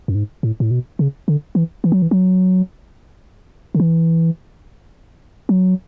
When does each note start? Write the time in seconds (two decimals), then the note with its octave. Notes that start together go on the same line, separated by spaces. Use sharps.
0.08 F#2
0.15 G#2
0.43 A2
0.60 A2
0.71 B2
0.99 C#3
1.28 D3
1.55 E3
1.84 E3
1.92 F#3
2.02 E3
2.11 F#3
3.75 D3
3.80 E3
5.49 F#3